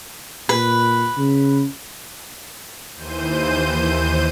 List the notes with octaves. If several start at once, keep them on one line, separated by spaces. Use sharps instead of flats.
A#2 B4
C#3
D#2 E3 C5 G6 D#7